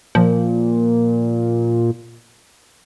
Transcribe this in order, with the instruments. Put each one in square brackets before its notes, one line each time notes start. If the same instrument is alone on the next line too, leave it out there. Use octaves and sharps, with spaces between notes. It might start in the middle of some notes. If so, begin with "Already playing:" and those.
[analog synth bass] A#2 [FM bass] F3